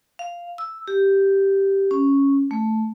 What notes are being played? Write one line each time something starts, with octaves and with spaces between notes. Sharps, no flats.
F5
E6
G4
C#4
A3